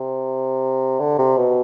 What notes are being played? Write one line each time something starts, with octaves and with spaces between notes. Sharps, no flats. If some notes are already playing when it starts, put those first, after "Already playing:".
Already playing: C3
D3
C3
B2